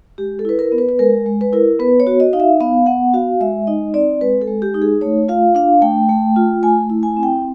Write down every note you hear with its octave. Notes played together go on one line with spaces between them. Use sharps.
G#3 G4
A4
E4 B4
A#4
B3
B4
B4
G#3 A#4
G#3
B4
E4 A#4
B3 B4
C#5
F#4
D#5
D#4 F5
E5
B3 F5
B3 F#5
F#4 F5
G#3 E5
D#4 D#5
C4 D5
G#3 B4
A4
G#3
G4
D#4
G#4
A3 C#5
F4 F5
D4 F5
A3 G5
A3
F4
A3 G#5
E4
G#5
C4
G5